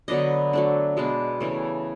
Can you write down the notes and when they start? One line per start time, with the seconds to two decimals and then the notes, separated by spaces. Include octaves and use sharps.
0.08 D3 F#3 B3 D4 D#5
0.53 F#3 A3 D4
0.97 B2 G#3 B3 D4
1.40 C#3 E3 A3